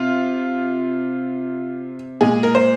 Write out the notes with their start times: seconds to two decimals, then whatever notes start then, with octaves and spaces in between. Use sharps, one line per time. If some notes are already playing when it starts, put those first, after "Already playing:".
Already playing: C3 F4
2.21 A#2 G#3 G#4
2.43 A#4
2.55 C5